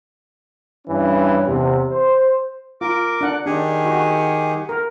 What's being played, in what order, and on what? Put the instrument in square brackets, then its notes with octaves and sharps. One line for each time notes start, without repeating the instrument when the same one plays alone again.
[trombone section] G2 E3 C#4
E2 C3
C5
[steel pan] F4 [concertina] A#4 D6
[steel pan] D4 F#5
[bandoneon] D#3 G4 F#5 [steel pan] D4 [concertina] G#4 G#5
[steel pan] F#4
A#4